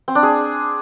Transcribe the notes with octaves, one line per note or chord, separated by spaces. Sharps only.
C4
D4
G#4